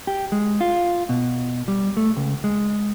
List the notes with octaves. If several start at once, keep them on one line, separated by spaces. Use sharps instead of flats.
G4
G#3
F4
B2
G3
A3
C#2
G#3